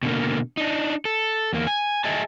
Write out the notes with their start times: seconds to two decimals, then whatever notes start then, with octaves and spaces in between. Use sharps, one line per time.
0.03 B2 D3 A#3
0.57 D4 D#4
1.05 A4
1.53 E2 A#3
1.67 G#5
2.04 G#4 D#5 E5 G#5 A5